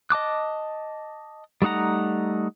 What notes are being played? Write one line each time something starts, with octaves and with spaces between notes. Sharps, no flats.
D#5 A5 D6 F#6
G3 A3 D#4 F#5 A#5